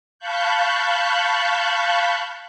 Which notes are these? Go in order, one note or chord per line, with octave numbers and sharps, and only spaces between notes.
F5 A5 B5 C#6 F#6 G6